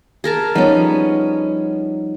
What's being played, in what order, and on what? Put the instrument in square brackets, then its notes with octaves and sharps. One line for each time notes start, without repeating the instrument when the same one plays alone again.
[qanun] G#4 A#4 A5
[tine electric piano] F3 G3 D#4 [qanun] B3 C#4